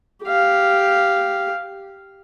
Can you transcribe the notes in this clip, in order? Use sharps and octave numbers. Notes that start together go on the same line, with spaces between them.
G4 F5